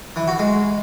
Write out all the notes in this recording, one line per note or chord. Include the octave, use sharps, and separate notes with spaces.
E3
F#4
G#3